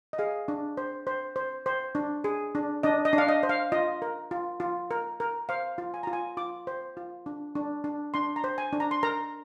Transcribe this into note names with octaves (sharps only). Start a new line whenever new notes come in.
D#5
G#4 F5
D4
C5
C5
C5
C5
D4
G#4
D4
D4 D#5
D#5
D4
F5
D#5
C5
F5
F4 D#5
A#4
F4
F4
A#4
A#4
C5 F5
F4
G#5
F4 A#5
G#5
F4 D6
C5
F4
D4
D4
D4
D4 C6
A#5
C5
G#5
D4
A#5
C6
A#4 A#5